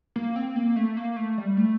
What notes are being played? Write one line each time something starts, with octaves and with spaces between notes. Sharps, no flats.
A#3
C4
A#3
A3
A#3
A3
G3
A3